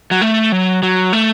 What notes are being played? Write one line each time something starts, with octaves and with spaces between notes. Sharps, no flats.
F#3
A3
F#3
F#3
A3